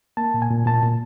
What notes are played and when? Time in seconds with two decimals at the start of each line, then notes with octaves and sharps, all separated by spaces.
0.17 A#3 A5
0.34 A#2
0.42 G#5
0.50 A#2
0.66 A#2 A5
0.83 A#2